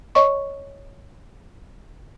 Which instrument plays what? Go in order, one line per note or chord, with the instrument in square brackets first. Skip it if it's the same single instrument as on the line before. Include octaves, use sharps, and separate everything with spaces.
[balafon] C#5 D#5 C#6